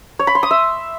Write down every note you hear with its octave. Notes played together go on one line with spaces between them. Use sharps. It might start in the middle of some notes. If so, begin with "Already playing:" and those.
C#5
B5
C6
D#6
E5